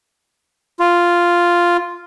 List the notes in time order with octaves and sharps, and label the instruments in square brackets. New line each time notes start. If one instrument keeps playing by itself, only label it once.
[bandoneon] F4